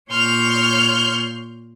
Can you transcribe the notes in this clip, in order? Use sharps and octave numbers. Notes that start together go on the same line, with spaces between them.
A#2 C#5 C6 F6 G6